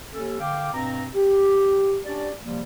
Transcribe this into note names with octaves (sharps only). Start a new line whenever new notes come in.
D#2 C#4 A4
D3 F5 G5 D6
G2 B2 C4 A#5
G4
C#4 D4 F#4 G4 D5
C3 F3 G3 A#3